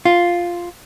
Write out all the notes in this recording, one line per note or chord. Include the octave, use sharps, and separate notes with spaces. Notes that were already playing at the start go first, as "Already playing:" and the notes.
F4